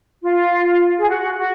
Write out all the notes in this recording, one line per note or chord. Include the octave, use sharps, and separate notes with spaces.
F4
G#4
F#4
F#4